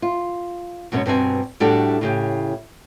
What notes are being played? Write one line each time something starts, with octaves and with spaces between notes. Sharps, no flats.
F4
F#2 B2 G#3 B3 C#4
G2 B2 C4 G#5
A2 G3 D4 F#4 G4 A4
A2 C#3 G4